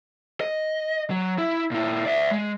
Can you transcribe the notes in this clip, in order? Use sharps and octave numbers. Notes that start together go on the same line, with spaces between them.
D#5
F#3
E4
A#2 E4
D5 E5
G#3